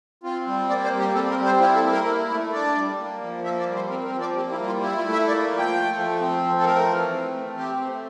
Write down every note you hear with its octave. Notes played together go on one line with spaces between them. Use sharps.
C4 F4
G3
A#3 D5
C5
G3
G4
C4 A4
A#4
G3
C5
E4 F4
A4
A#3
A#4
E4
A3
D4 D5
G3
A#3
F3
A#3 E5
D5
G3
C5
C4 A#4
A#4
F3
D5
A#3 G4
E4
G3
F4
E4
F4
A3
E5
A#3 D5
F3
G5
A3
F3
C4
F3
A4
A3 A#4
E3
C4
A3
C4 G4
A3